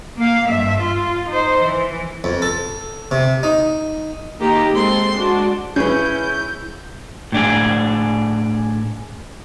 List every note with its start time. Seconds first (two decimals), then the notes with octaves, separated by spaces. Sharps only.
0.17 A#3 F5
0.48 G2 E5
0.80 F4
1.29 D#4 C5
1.62 E3
2.24 F2
2.42 A4
3.11 C3
3.43 D#4
4.39 D#3 A#3 D#4 G4 A#5
4.72 G#3 C4 A4 C6
5.19 G#3 D4 F#4
5.76 C#3 C#4 E4 G#4 B4 G6
7.32 A2 D4 G#4